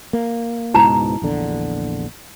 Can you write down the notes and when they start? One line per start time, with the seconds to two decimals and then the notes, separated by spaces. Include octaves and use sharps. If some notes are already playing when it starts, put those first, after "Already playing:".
0.13 A#3
0.74 C#2 G#2 B2 E4 A5 A#5
1.22 A#1 E2 D3